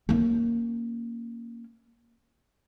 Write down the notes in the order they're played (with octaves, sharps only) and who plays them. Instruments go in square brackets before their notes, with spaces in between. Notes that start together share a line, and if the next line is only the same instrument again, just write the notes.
[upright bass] A#3 C#4